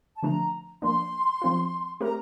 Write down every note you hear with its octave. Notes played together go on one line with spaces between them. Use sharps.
A5
D3 F3 A3 D4 A#5
F3 A#3 D4 C6
F3 C4 F4
A3 C4 G4 A#4 A#5